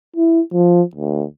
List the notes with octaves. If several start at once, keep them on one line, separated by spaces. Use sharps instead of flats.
E4
F3
D2